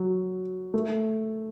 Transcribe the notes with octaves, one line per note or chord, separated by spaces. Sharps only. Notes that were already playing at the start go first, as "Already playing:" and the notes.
Already playing: F#3
A3